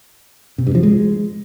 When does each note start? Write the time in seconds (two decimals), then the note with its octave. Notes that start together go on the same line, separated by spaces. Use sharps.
0.58 C3
0.67 G2
0.75 F3
0.83 G#3